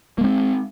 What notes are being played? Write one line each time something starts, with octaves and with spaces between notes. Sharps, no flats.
G#3 A#3 C4